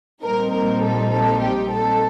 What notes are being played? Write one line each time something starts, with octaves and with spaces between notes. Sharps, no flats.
A#1 A#2 G3 C4 D#4 A#4
A#4
A4
A4
G4
A4